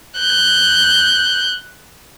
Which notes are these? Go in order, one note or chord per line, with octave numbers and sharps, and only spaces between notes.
F#6 G6